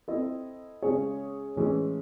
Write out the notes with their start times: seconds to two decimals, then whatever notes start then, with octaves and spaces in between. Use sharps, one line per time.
0.08 C4 E4 A4 D#5
0.82 C#3 G#3 C#4 G#4 C#5
1.56 A2 E3 G#3 C#4